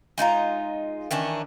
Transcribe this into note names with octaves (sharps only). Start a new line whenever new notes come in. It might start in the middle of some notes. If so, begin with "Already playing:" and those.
G#3 D#4 F4 A#5
D#3 E3 C#4 D4